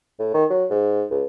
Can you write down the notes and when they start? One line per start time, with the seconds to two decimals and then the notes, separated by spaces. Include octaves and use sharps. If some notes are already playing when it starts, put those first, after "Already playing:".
0.19 A2
0.34 D#3
0.50 F#3
0.70 G#2
1.11 C#2